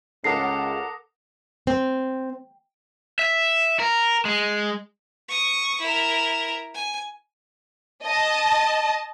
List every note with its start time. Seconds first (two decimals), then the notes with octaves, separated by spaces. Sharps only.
0.24 C#2 A4 A#4 F#5 D6 D#6 A#6 C7
1.67 C4
3.19 E5
3.80 A#4
4.25 G#3
5.28 C#6 D#6
5.80 E4 A#4
6.74 G#5
8.04 D#5 A5